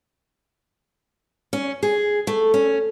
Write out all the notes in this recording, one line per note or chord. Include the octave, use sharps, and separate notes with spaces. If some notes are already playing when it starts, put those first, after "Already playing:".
C#4
G#4
A3
C#4